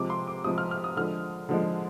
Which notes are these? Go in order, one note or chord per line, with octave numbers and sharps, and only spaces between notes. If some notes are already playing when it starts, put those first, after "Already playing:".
Already playing: C3 F3 G#3 D6
C6
D6
C3 F3 G#3 D#6
F6
F6
D#6
D3 F3 G#3 F6
D3 F3 G#3